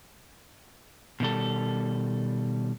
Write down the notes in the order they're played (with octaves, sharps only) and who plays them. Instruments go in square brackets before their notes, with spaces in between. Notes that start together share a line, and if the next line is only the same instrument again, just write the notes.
[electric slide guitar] B2 D#3 G3 A4